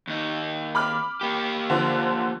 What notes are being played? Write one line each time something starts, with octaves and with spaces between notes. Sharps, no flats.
D#2 D#4
B5 D6 F6
A#3 G4
D3 F3